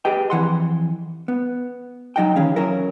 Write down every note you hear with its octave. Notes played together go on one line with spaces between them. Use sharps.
G4 G#4 B4 D#5 G5
F2 E3 F#5 C6
B3
F#3 D#4 D#5 F#5 G5
D#3 E3 C#4 G#4 F5
F#3 C#4 E4 A#4